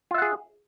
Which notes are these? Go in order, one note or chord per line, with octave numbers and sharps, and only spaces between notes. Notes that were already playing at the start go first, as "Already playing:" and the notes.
F4 G#4 E5 F#5